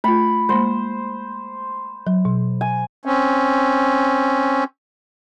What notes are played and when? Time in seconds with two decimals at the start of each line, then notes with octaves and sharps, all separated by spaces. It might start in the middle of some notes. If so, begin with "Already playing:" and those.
0.04 A3 F4 B5
0.49 G#3 A#3 C5
2.07 F#3
2.25 B2
2.61 G#5
3.05 C4 C#4